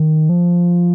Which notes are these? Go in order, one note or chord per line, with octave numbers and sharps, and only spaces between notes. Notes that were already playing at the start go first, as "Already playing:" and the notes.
Already playing: D#3
F3